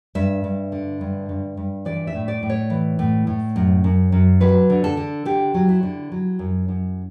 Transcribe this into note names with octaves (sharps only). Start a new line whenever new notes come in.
G2 E5
G2
D3
G2
G2
G2
E3 D5
E5
A2
D5
A2
C#5
E3
A2
A2
F#2
F#2
F#2
F#3 B4
D3
A4
D3
D3 G4
F#3
E4
D3
F#3
F#2
F#2